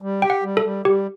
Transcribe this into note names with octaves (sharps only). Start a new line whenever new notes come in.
G3
G4 G5
F#5
G3
A4
G3
G3 G4